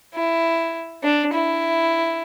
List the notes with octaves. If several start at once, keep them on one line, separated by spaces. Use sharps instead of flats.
E4
D4
E4